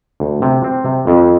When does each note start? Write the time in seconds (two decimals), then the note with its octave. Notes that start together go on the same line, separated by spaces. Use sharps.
0.20 D2
0.42 C3
0.64 C4
0.85 C3
1.07 F2